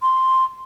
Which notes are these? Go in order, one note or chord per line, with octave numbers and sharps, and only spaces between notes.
C6